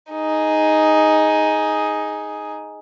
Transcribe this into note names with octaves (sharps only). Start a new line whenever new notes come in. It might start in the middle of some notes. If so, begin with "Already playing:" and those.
D#4 G#4